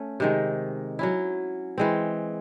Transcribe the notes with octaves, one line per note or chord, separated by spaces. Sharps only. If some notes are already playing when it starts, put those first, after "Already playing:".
Already playing: A3 C#4
C3 D#3 G#3
F#3 C#4 E4
E3 G#3 C4